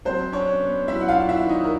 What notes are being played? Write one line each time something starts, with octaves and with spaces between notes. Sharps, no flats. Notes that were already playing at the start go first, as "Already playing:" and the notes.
F#3 C4 C5
C#4 D4 C#5
B3
F#3 E4 E5
F#5
F4 F5
D4
E4 E5
D#3
D#4 D#5
A#4